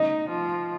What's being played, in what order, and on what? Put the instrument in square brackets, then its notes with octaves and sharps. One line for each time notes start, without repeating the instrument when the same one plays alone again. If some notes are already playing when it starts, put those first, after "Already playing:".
Already playing: [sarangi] D#4 [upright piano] D#5
[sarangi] F3